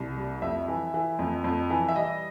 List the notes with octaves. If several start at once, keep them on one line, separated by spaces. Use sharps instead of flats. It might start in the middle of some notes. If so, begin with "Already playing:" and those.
Already playing: C2
G3
F2 E5
E3
E3
F2
F2
E3
E5
G3 D#5